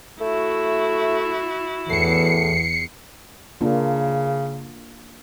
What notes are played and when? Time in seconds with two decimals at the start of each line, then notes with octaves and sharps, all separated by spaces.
0.20 A3 E4 F#4
1.90 E2 A2 C7 C#7
3.61 C#3 A#3 D4 F4